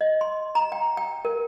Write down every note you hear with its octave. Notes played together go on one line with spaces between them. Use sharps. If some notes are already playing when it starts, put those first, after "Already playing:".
D#5
C6
A#5
G5
G5
A#4